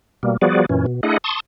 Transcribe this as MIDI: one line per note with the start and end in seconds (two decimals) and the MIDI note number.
0.23 0.37 47
0.23 0.37 55
0.23 0.37 58
0.42 0.66 53
0.42 0.66 55
0.42 0.66 59
0.42 0.66 66
0.42 0.66 68
0.42 0.66 74
0.69 0.86 42
0.69 0.86 46
0.69 0.86 52
0.69 0.86 61
0.86 1.01 47
1.03 1.18 57
1.03 1.18 62
1.03 1.18 64
1.03 1.18 68
1.03 1.18 75
1.03 1.18 78
1.24 1.40 81
1.24 1.40 84
1.24 1.40 85
1.24 1.40 87